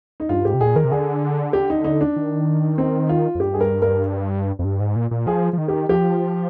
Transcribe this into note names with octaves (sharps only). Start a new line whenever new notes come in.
D#4
G2 F4
G#2 G4
C3
A#2 G#4
D#3 A#4
C3
D3 G#4
G4
D#4
D#4
D4
D#3
C4
F4
F2
G2 G4
G#4
A#4
A#4
F2
G2
G#2
A#2
A#2
F3 G#4
F3
D#3
G4
F3 G4